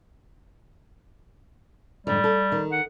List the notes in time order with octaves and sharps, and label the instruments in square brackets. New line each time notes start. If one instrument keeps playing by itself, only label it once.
[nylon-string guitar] F2 G#2 D3 [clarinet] G3
[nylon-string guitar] A4
D#3
[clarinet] F#5